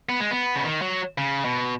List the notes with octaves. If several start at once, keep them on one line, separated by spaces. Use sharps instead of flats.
B3
G#3
B3
C#3
D#3
F#3
C#3
B2